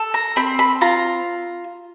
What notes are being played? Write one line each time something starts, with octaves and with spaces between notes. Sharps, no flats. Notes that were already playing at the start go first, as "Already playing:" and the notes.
Already playing: A4
A#5
C4 B5
B5
F4 A#5